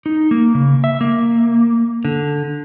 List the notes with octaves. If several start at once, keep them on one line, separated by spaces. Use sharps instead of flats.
D#4
A#3
C#3
E5
A#3
D3